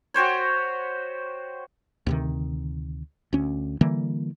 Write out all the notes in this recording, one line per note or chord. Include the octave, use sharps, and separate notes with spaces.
F#4 G4 C5 C#5
D2 C3 D#3
D2 C#4
D3 E3 G3 A#3